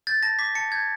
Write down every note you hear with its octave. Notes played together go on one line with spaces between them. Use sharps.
G6 A6
A5 A#6
D6 B6
A5 C#7
G6 G#6